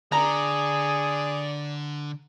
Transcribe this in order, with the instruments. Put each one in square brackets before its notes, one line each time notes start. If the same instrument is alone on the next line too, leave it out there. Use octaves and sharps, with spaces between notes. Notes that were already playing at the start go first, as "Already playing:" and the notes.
[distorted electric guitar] D3 [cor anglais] G#4 [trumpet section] D5 [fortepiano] A#5